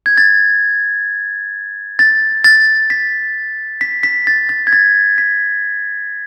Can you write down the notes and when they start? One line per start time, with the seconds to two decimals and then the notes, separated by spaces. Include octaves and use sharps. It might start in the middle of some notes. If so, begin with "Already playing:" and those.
0.06 G#6
0.18 A6
1.99 A6
2.44 A6
2.90 B6
3.81 B6
4.03 B6
4.27 A6
4.49 A6
4.67 G#6
4.73 A6
5.18 B6